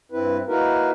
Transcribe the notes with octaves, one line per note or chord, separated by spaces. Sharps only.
G2 C4 E4 B4
A#3 D#4 E4 F#4 A#4 B4